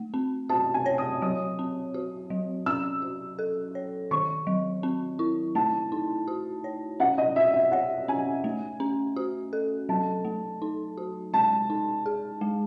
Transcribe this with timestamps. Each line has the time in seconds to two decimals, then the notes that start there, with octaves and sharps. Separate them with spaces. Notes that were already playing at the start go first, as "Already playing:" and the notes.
Already playing: A3
0.14 C4
0.49 F#4 A5
0.74 G#5
0.86 C#5
0.98 D#6
1.22 F#3 D#6
1.59 C4
1.94 F#4
2.30 F#3
2.66 C#4 E6
3.02 F#4
3.39 A4
3.75 C#5
4.11 D#3 C#6
4.47 F#3
4.83 C4
5.19 E4
5.55 A3 A5
5.92 D#4
6.28 F#4
6.64 C#5
7.00 C#4 F#5
7.18 D#5
7.36 F#4 E5
7.54 E5
7.72 C#5 F#5
8.08 C#4 G#5
8.44 A3
8.80 C#4
9.16 F#4
9.53 A4
9.89 F#3 A5
10.25 A3
10.62 D#4
10.98 F#4
11.33 G#3 A5
11.70 D#4
12.06 G#4
12.41 G#3